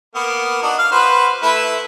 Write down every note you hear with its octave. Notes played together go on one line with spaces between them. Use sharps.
A#3 B3
D4 D#4 F#4
F5
F#4 B4 C5
A3 E4 B4